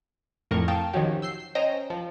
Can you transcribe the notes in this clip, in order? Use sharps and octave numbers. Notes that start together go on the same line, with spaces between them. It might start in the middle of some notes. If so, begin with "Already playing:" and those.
F2 A2 A#4 C#6
F5 G5 A5 D#6
D#3 F3 F#3 C#4 F#4 G4
E6 G6 C7
C#4 C5 D#5 G5 A#5
F3